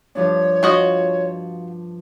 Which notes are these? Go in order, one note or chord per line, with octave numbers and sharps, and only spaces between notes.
G2 F3 D4 C#5
F4 F#4 D#5